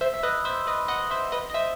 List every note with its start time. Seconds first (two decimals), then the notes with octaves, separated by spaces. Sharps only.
0.01 C5 E5
0.14 E5
0.23 B4 D#5
0.45 C5 E5
0.67 B4 D#5
0.88 D#5 F#5
1.11 C5 E5
1.32 B4 D#5
1.50 D#5
1.54 C5 E5